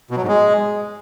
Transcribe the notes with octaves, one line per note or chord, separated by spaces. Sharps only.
B2
F#3
G#2
G#3